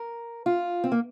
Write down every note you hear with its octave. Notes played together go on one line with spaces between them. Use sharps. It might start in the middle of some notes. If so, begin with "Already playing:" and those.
Already playing: A#4
F4
C4
A#3